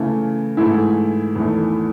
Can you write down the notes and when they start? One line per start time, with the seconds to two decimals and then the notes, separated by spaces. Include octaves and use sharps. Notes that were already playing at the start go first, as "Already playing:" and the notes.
Already playing: C#3 E3 A3
0.57 G#2 E3 A3 E4
1.35 E2 D#3 A3